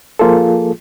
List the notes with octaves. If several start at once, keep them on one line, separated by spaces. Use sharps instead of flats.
F3 A#3 F4 G#4 A4